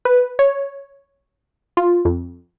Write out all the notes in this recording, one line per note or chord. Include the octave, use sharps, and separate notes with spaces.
B4
C#5
F4
F2